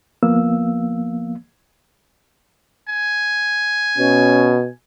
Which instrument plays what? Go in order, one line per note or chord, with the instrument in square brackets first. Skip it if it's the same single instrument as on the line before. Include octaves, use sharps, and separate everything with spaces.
[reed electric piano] D2 F3 A#3 B3 F5 E6
[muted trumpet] G#5
[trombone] B2 [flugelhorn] C#4